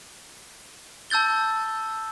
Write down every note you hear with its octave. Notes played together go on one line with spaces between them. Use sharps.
A5 E6 G6 A6 G7